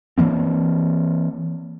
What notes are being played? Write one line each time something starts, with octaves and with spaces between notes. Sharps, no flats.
E3 F#3 A#3 C4